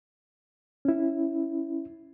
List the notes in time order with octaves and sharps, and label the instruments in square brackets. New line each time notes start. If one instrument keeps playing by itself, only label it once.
[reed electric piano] C#4 E4